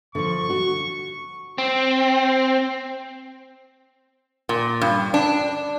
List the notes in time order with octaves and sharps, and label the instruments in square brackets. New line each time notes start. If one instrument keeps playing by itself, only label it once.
[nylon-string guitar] D3 F3 [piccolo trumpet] C#6
[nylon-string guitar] F#4
[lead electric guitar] C4
[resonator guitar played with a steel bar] A#2
G2
D4